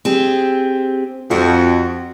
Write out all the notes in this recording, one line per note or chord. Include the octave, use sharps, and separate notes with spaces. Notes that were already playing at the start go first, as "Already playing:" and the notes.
C4 G4 G#4
F2 F#4